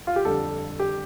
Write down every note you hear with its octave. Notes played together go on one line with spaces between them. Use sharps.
F4
G4
F2 D3 G3 A4
G4